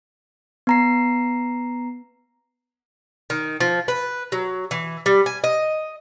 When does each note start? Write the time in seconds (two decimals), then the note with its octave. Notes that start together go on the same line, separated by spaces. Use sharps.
0.67 B3 A#5 C7
3.30 D#3
3.60 F3
3.88 B4
4.32 F#3
4.71 E3
5.06 G3
5.26 G#5
5.44 D#5